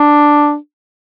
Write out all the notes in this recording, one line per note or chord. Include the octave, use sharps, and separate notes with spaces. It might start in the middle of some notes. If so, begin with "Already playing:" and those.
Already playing: D4